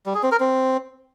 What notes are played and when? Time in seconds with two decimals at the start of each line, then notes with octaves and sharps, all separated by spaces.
0.06 G3
0.14 G#4
0.23 C4
0.32 A#4
0.40 C4